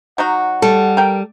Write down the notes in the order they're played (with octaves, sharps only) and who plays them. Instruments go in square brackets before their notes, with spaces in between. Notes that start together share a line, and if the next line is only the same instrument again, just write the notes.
[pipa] F#3 D#4 F#4 [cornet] F#5
[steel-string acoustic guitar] G3 [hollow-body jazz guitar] A4
[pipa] A#4 G5